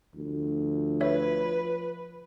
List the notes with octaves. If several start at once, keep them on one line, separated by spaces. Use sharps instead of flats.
D2 F3
B4 C#5 E5